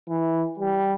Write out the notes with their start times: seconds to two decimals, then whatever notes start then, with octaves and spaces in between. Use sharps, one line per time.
0.09 E3
0.59 G3